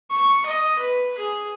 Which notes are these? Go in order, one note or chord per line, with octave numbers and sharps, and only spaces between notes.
C#6
D#5
B4
G#4